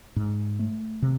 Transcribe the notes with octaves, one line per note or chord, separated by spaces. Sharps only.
G#2
A3
C3